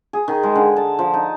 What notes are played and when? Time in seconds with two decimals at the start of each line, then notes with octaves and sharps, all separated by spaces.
0.13 G#4
0.28 D#3
0.43 G#3
0.55 D3
0.76 A5
0.99 F3
1.14 D#4